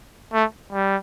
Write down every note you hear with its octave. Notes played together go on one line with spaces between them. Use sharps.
A3
G3